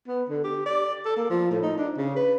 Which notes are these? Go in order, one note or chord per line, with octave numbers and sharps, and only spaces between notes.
B3
D3
G4
D5
A4
A#3
F3
A2
D#4
D4
C#3
B4